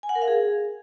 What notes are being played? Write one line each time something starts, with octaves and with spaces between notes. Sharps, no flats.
G#5
F#5
A#4
F5
G#4